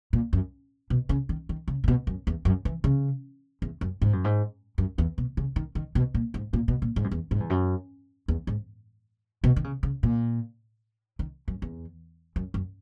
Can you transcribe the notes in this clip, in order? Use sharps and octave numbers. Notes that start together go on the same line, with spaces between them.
A#2
F#2
B2
C#3
D#3
D#3
C#3
A#2
B2
F#2
E2
F#2
E3
C#3
E2
F#2
G#2
F#2
G#2
F#2
E2
B2
C#3
D#3
D#3
B2
A#2
G#2
A#2
B2
A#2
G#2
F#2
E2
G#2
E2
F#2
E2
G#2
B2
D#3
C#3
C#3
A#2
D#3
F#2
E2
F#2
F#2